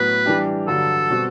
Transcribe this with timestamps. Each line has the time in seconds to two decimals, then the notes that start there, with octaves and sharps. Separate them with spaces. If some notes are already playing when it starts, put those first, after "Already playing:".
Already playing: A2 F#3 B3 B4
0.26 E3 G3 D4 G4
0.67 G2 D3 F#3 A4
1.10 B2 G3 C4 F#4